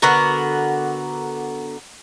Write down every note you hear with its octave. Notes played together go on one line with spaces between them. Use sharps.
D3 B3 F#4 A#4